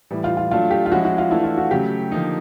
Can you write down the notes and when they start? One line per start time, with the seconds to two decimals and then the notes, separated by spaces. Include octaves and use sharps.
0.11 A2 E3 G3
0.24 F4
0.37 F4
0.51 F#3 A3 D4 F4
0.71 G4
0.86 F4
0.91 F3 G#3 C#4 E4 F#4
1.05 F#4
1.18 F4
1.31 E3 A3 D4 E4
1.44 F4
1.57 F#4
1.71 C#3 F#3 A3 G4
2.11 D3 F3 A#3 D#4